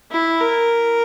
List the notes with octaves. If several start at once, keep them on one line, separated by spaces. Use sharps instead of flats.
E4
A#4